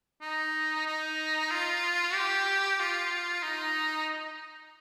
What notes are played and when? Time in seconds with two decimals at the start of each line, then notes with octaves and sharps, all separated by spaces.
0.21 D#4
0.86 D#4
1.51 F4
2.14 G4
2.79 F4
3.43 D#4